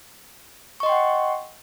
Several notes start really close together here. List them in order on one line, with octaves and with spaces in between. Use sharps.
C#6 D#5 C6 G5 F#5